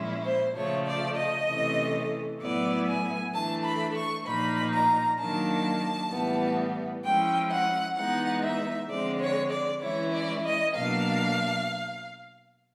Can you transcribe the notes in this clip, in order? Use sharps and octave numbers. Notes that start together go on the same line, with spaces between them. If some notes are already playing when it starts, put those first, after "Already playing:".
Already playing: A#2 F3 G#3 C#4 E4
C5
C#3 F3 A3 C#5
D5
D#5
C3 E3 A3 C#4
A2 F#3 B3 E4 D5
G#5
E3 A3 D4 A5
B5
C#6
A#2 F3 A#3 D#4 B5
A#5
D#3 F#3 A#3 D4 A5
A2 E3 G3 B3
F3 G#3 C#4 E4 G5
F#5
E3 G#3 B3 D#4 F#5
E5
D3 F3 G#3 C4 D5
C#5
D5
E3 G#3 C#4 E4 C#5
D5
D#5
B2 F#3 A#3 D4 F5